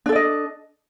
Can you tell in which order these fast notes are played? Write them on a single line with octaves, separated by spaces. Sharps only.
D4 A4 D5 D#5